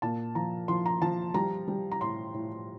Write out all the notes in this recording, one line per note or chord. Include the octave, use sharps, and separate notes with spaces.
A#2 A5
F3 A#5
F3 C6
A#5
F3 A5
G3 A#5
G3
A#5
A2 C6
A2